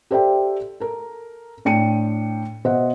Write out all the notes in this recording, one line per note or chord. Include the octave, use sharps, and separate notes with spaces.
G4 A4 C5 D5 E5 G5
A4 A#4
A2 D4 G5 C#7 D#7
B2 C5 D#5 E5 F#5